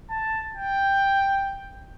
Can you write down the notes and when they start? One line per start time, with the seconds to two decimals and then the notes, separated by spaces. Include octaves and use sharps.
0.10 A5
0.56 G5